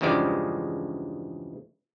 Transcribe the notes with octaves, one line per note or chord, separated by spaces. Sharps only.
E2 G2 C#3 F3 G#3 D5